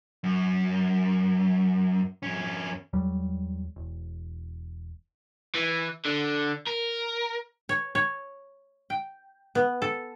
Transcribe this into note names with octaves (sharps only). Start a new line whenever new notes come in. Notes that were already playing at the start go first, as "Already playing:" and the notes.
F#2
F2 C#4
E2 F#3 G3
E1
E3
D3
A#4
C#5
C#5
G5
B3
A4